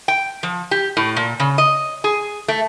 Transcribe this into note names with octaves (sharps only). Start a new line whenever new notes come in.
G5
F3
G4
A2
A#2
C#3
D#5
G#4
A3